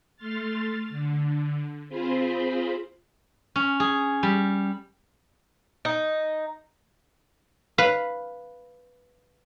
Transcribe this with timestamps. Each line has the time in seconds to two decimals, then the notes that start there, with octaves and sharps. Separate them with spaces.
0.16 A3 C6 F6 A6
0.89 D3
1.88 C4 F4 G#4 C5 B5
3.56 C#4
3.80 G#4
4.23 G3
5.85 D#4
7.78 B4 F5